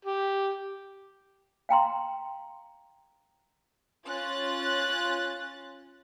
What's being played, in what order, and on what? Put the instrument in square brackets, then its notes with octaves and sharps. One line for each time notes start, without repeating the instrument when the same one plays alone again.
[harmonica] G4
[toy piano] F5 G5 A#5 C6
[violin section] C#4 F4 F#6 A6